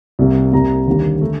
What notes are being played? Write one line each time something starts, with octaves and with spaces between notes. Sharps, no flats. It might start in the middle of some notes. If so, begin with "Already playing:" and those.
C2 C3 G3 A#3
C2 C3 G3 A#3 A#5
D#2 D3 G3 A#3
D3 A3